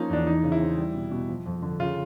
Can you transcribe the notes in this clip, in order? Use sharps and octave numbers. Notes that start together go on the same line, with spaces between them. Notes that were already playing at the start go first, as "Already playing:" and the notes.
Already playing: F3 A#3 C#4 D#4
E2 D4
E3 D#4
C#3
E4
C4
G3
B2
B2
F3
F2
D3
C#3 F4